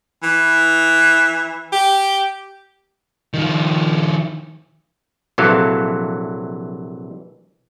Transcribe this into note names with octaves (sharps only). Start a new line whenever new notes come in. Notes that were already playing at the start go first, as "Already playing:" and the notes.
E3
G4
D#3 F3
A#1 C3 E3 F#3 A4 F5